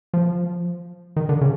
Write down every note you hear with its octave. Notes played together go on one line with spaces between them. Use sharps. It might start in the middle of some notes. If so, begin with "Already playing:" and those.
F3
D#3
D3
C#3